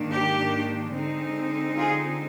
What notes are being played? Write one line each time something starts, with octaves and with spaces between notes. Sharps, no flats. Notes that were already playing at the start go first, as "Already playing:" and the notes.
Already playing: G#2 D#3 A#3 D4
G4
D3 G#3 C4 D#4
F4 G#4